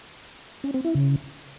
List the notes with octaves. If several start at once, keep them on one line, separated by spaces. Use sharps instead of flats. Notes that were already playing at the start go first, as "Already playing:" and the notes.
C#4
C4
E4
C#3